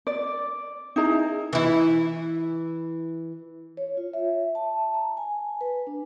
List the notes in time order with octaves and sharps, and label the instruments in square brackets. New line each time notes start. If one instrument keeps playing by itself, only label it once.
[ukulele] D5
D#4 E4 G#4 A#5
[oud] E3 E4
[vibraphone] C#5
F4
E5
A5
A#5
G#5
B4
D4